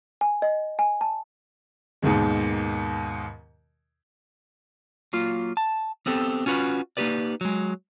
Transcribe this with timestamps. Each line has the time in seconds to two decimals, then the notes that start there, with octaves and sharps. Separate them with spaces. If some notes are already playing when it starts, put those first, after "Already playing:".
0.21 G#5
0.42 D#5
0.79 G#5
1.01 A5
2.02 D#2 G#2 B2 D#3 G#3
5.13 F#3 A#3 F4
5.57 A5
6.06 B3 C4 G4 A4
6.46 C#4 F4 F#4 B4
6.97 A#3 D#4 E4 G4 B4 D5
7.41 F#3 G#3